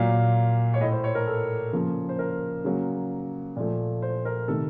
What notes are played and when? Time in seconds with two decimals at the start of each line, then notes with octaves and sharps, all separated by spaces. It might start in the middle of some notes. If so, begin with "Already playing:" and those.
Already playing: A#2 F#3 A#3 F5
0.74 C#5
0.81 A2 D#5
0.84 A3
0.92 C5
1.04 C#5
1.15 A#4
1.27 A4
1.73 C#3 F3 A#3
2.09 C5
2.19 A#4
2.64 C#3 F#3 A#3
3.56 A#2 F3 A3
4.02 C5
4.25 A#4
4.48 C3 D#3 A3 A4